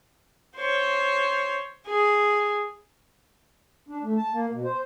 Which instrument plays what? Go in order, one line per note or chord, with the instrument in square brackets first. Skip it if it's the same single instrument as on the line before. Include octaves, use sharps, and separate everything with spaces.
[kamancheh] C5 C#5
G#4
[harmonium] D4
A3
A5
A#3
B2
C5